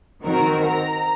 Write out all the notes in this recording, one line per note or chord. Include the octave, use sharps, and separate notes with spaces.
D#3 C4 F#4 A#4
A#5